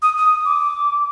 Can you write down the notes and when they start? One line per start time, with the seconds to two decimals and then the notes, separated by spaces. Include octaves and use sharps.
0.02 D#6
0.17 D#6
0.45 D6